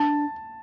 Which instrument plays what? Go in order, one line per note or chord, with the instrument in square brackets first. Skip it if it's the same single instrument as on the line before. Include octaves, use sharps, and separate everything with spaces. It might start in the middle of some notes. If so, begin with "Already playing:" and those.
Already playing: [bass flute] D4 [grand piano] A5